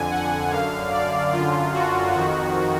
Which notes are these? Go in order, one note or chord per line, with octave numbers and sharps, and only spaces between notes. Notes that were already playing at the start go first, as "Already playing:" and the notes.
Already playing: F2 D3 G#5
F#5
F#2 D3 F5
D5
F#2 D3 F4
F#4
F2 D#3 F#4